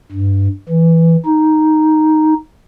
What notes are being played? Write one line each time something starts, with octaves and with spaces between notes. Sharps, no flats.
G2
E3
D#4